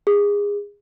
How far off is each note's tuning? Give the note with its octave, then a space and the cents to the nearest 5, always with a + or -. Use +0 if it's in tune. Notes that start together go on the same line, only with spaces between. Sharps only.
G#4 -25